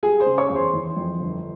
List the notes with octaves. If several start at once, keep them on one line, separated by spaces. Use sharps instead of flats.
G3 G#4 G#5
C5 C6
C#3
C#5 C#6
E2
C5 C6
E3
F2
G1